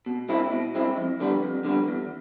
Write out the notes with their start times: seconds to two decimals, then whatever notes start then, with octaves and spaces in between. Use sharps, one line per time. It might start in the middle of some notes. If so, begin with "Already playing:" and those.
0.06 B2
0.29 G#3 C4 E4
0.52 B2
0.75 G#3 C4 E4
0.98 F2
1.20 D3 G3 B3
1.43 F2
1.65 D3 G3 B3
1.88 E2